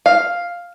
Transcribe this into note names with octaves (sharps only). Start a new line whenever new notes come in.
F5